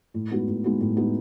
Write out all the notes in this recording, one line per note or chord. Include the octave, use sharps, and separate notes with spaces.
A2
G#3 B3 D#4 F#4
A2
G#3 B3 D#4 F#4
A2
G#3 B3 D#4 F#4